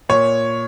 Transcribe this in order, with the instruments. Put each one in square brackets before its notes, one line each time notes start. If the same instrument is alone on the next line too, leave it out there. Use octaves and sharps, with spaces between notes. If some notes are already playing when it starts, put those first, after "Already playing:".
[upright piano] A#2 C#5